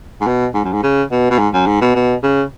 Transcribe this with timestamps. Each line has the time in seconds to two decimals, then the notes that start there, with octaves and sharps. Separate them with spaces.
0.21 G#2
0.27 B2
0.54 G#2
0.64 F#2
0.73 G#2
0.83 C#3
1.11 B2
1.31 B2
1.39 G#2
1.54 F#2
1.67 G#2
1.81 B2
1.95 B2
2.23 C#3